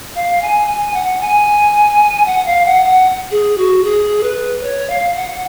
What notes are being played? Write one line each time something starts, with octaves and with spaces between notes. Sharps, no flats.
F5
G#5
G#5
F#5
G#5
F#5
F5
F#5
F#5
G#4
F#4
G#4
B4
C#5
F5
F#5